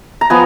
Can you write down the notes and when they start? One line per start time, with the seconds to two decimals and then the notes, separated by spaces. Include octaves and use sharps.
0.21 A#5
0.30 F3 B3 G#5